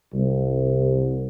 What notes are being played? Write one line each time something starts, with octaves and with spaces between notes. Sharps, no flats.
C2